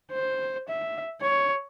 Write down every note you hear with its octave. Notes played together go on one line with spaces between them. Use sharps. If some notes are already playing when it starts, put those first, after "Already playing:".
C5
E5
C#5